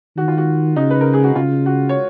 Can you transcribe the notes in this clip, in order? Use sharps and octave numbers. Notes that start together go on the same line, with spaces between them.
D#3 F#4
F4
F#4
C#3 D#4
B4
A#4
G#4
F#4
C#3 F4
F#4
C#5